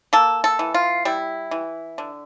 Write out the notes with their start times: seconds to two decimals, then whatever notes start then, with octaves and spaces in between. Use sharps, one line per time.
0.13 A#3 A4
0.44 A4
0.59 E3
0.74 F4
1.05 G3 E4
1.51 E3
1.98 D3